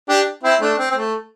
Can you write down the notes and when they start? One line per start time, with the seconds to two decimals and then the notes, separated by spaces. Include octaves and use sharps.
0.09 D4 G4
0.43 C4 E4
0.61 A3 D4
0.78 C4
0.91 C4
0.95 A3